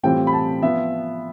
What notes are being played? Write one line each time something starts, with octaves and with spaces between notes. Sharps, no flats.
A2 E3 G3 C4 F4 G5
B5
A5
F3 B3 F4 E5